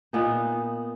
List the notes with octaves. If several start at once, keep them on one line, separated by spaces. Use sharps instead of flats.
A#2 B3 D#4